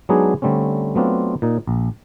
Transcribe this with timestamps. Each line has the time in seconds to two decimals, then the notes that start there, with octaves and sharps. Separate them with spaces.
0.09 F#3 G#3 B3 D4 D#4 G#4
0.42 D3 G3 A3 C4 C#4
0.95 F#3 A3 B3 C4 D4 F4
1.42 A#2 D#4
1.67 A#1